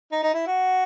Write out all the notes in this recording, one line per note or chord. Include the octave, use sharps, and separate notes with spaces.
D#4
D#4
E4
F#4